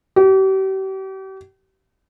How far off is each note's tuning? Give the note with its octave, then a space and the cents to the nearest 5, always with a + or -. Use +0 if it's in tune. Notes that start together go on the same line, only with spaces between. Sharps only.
G4 -40